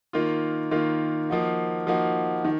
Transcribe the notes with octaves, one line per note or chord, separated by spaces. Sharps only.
D#3 A#3 F4
D#3 A#3 F4
F3 A#3 D#4 F#4
F3 A#3 D#4 F#4
D#3